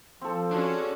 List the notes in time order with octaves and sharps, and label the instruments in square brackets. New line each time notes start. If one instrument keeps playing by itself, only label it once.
[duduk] F3 [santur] C4 A4
[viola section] C#4 F#4 G#4 [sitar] D4